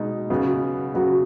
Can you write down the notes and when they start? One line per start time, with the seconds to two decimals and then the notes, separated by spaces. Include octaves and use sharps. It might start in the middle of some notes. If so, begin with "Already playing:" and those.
Already playing: B2 G#3 D#4
0.30 C#3 F#3 B3 F#4
0.95 C#3 F#3 B3 F#4